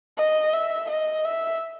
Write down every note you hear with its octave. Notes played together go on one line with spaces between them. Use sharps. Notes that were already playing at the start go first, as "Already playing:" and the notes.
D#5
E5
D#5
E5